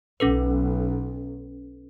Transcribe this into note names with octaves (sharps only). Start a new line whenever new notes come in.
B1 C#4 A4 B4